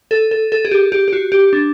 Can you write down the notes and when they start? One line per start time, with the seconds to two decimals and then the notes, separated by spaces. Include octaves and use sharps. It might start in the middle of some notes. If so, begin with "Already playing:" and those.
0.11 A4
0.31 A4
0.52 A4
0.65 G#4
0.71 G4
0.92 G4
1.08 G4
1.13 F#4
1.32 G4
1.53 D4